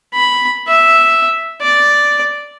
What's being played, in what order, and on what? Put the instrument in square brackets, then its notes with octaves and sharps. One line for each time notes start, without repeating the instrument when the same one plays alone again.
[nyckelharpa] B5
E5
D5